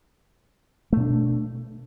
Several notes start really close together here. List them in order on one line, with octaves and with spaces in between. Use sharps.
A3 B2 D4